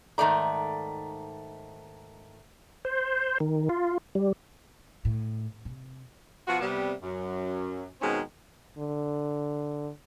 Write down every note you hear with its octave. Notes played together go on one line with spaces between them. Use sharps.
G#2 D#3 A3 D5 A#5
C5
D#3
F4
G3
A2
C3
B2 F3 B3 F4 F#4
C3 G3 B3
F#2
B2 D#3 G#3 C4 C#4 D#4
D3